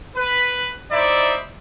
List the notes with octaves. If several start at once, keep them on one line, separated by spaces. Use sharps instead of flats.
B4
D#4 E4 C5 D5 E5